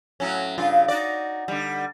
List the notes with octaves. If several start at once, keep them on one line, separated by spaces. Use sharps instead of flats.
A2 F#3 C#4
G2 C#3 F4
D#4 F#4 D5
D3 G3